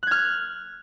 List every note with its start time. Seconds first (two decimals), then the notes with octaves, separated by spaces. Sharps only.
0.03 F#6
0.07 G#6
0.11 F6